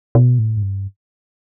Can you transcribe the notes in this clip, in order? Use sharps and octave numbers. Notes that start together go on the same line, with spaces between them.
B2
A2
G#2
G2